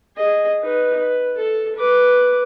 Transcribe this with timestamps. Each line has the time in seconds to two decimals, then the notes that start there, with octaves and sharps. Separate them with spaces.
0.16 G#4 D#5
0.61 D#4 B4
0.98 B4
1.38 A4
1.76 B4 D6